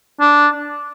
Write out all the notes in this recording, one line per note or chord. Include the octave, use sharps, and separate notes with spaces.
D4